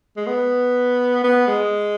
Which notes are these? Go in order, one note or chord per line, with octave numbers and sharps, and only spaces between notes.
G#3
B3
B3
G#3